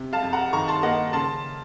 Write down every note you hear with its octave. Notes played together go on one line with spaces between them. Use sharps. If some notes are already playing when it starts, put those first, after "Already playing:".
Already playing: C3
F5 A5
F2
F#5 A#5
D#3 A#5 C#6
A5 C6
A#3 D#5 F#5
C#3 A5 C6